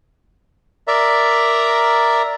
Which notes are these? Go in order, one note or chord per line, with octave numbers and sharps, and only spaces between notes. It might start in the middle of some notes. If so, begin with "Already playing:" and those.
A#4 D5 E5 A#5